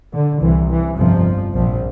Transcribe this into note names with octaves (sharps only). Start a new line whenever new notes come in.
D3
C2 C3 E3
E3
G1 F2 C3 F3
A#1 A#2 F3